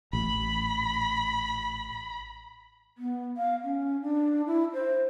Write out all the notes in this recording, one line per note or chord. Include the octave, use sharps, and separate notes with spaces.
A1 B5
B3
F5
C#4
D4
E4
C5